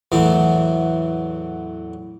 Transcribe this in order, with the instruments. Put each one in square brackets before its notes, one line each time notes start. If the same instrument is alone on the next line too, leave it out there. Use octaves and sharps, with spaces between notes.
[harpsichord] E2 A2 E3 F#3